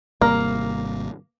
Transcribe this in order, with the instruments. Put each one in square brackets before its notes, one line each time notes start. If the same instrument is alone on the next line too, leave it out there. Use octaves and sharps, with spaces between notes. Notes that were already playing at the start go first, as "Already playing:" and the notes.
[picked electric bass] G#1 C3 G3 [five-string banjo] A#3